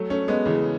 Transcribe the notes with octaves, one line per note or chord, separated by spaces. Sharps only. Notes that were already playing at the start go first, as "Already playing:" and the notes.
Already playing: F#3 A3
A3 C#4
G#3 B3
C#3 E3